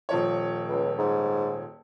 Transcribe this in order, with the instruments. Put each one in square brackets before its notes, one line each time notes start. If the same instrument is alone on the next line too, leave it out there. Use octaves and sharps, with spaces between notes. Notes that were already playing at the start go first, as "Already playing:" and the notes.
[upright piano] D#1 F3 C#5
[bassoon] C#2
G#2